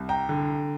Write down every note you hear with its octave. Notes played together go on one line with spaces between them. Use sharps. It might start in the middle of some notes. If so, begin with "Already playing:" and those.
Already playing: C2
G5 A#5
D3